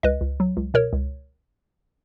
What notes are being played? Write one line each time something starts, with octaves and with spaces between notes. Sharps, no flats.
C#2 B4 D#5
C#2
F#3
C#2
B2 A#4 C#5
C#2